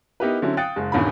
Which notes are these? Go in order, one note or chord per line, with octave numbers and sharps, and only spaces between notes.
B3 D#4 E4 G4 A#4 B4
D3 F#3 C4 C#4 E4
F5 G5 D#6 F#6 A6 C#7
F#1 G#3
D#1 E2 G2 D#3 C#4 B5